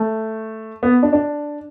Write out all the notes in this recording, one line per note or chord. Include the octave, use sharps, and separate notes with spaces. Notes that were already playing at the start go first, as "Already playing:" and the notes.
Already playing: A3
B3
D4
D4